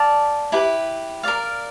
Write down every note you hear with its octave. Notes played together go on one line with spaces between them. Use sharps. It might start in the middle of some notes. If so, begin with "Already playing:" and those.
Already playing: D5 F5 A5
E4 G4 B4
A#4 D5 F5